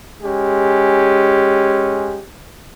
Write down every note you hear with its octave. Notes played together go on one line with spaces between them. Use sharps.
G#3 C#4 G4